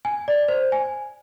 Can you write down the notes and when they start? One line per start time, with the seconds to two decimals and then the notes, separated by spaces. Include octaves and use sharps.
0.05 G#5
0.28 D5
0.48 C5
0.72 G#5